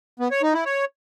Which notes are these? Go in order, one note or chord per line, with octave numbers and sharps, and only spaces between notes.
B3
C#5
D#4
E4
C#5